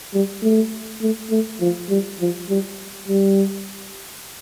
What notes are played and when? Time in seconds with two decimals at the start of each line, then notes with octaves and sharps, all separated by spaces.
0.13 G3
0.43 A3
1.02 A3
1.31 A3
1.60 F3
1.89 G3
2.20 F3
2.49 G3
3.08 G3